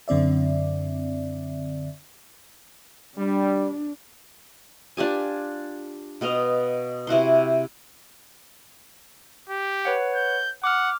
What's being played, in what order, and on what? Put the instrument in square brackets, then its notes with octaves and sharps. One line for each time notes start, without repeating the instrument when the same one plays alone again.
[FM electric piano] F#2 D3 C4 D5 E5
[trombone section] G3 [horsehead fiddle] D4
[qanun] D4 F4 G4 G#5
B2 B3 D#5 F5
C3 E4 F#4 C6
[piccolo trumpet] G4
[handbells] B4 C#5 F#5
[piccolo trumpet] G6
[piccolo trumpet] F#5 [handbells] D6 F6